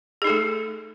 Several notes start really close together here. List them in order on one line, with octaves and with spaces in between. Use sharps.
G#4 D#4 A4 A3